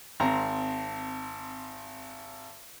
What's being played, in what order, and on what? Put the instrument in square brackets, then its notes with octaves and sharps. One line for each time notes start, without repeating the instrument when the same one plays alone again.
[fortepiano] G#1 C4 A#5